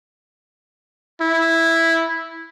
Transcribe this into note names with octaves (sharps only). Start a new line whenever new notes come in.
E4